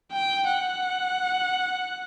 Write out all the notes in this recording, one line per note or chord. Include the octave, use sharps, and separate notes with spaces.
G5
F#5